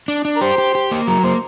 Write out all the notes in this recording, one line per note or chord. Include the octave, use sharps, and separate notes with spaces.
D4
D4
A#4
G4 C5
G4
G4
A#3
F#3 A#4
A#3 C5